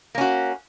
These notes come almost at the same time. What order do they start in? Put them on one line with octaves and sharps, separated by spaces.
A#3 C#4 F#4